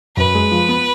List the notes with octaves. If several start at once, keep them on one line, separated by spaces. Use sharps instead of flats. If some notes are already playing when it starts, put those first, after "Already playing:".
F#2 B4
G#3
F3
B3